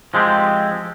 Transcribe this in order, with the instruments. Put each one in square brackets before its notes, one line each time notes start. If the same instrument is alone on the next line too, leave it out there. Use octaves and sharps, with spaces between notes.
[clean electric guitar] F3 G#3 C4 G4